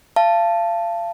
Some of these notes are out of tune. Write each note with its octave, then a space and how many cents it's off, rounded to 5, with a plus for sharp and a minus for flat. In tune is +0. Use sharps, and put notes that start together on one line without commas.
F5 -35 A5 +0